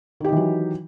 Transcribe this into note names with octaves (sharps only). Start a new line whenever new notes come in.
D#3 E3 F#3 D#4 G4